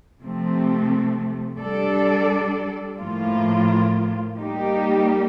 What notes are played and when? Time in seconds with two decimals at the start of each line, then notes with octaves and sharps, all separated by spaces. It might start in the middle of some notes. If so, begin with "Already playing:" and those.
0.21 C3 F3 A3 C4
1.60 G3 D4 A4 D5
2.98 A2 F3 A#3 F4
4.37 G3 A#3 D#4 G4